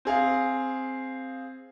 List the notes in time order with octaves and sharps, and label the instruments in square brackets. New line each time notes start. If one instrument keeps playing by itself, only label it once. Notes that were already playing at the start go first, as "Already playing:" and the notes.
[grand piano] C4 G#4 F5